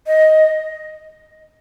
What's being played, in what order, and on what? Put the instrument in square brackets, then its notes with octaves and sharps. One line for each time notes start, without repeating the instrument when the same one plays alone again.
[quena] D#5